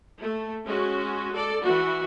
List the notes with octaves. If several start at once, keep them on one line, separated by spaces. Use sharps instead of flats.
A3
G#3 C#4 F#4
A4 D5
E3 F#4